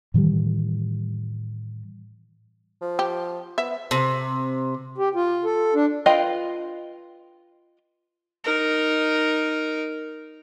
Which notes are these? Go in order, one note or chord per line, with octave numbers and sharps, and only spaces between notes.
A2 D#3 E3 G3
F3
G4
B3 E5
C3
G4
F4
A4
D4
F4 B4 D#5 F5 G5
D#4 A#4